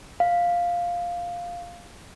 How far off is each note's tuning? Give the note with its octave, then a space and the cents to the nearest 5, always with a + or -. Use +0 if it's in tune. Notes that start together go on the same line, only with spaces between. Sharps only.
F5 +0